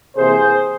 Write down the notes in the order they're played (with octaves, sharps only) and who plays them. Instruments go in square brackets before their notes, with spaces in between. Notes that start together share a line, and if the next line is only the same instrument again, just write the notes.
[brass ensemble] C3 E3 A#3 G#4 C5